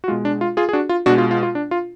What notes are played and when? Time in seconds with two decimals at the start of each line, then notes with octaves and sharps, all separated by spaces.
0.04 F#4
0.08 B2 G#3 F4
0.25 D4
0.41 F4
0.57 F4 G#4
0.69 G#4
0.73 D4 F#4
0.89 F4
1.06 B2 G#3 D4 F#4
1.18 F4
1.31 F4
1.43 F4
1.55 D4
1.71 F4